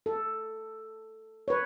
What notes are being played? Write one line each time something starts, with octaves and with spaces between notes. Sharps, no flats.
A4
B4 C#5